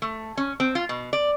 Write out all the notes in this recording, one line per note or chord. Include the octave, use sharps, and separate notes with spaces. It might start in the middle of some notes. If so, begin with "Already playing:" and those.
A3
C#4
C4
F4
B2
D5